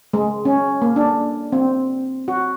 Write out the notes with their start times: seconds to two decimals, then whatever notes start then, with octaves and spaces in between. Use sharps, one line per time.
0.13 G#3
0.45 C#4
0.82 A#3
0.96 D4
1.52 C4
2.28 F#4